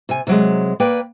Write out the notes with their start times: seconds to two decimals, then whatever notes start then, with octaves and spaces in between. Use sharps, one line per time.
0.09 C3 G#5
0.27 C3 F#3 G#3
0.80 A#3 B4 D5 G5